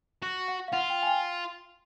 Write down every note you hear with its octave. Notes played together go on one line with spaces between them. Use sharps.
F#4
F#5
F5
F4 F#5
G5
G#5
G5